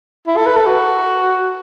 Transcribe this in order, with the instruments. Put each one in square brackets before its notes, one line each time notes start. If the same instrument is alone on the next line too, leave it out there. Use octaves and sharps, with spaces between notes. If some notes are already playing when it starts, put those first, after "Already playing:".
[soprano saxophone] E4
A4
B4
A4
F#4